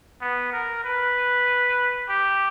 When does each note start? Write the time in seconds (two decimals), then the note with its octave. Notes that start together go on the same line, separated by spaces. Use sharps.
0.21 B3
0.53 A#4
0.84 B4
2.09 G4